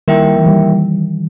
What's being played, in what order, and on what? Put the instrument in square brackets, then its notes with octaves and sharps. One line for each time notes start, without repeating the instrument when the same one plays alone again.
[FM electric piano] D#3 G3 [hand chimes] A#3 E4 A#4 E5 G5
[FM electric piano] E3
D#3 G3